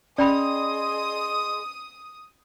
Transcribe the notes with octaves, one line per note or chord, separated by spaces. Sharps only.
C#4 G#4 D5 D#5 G5 B5 C6 D#6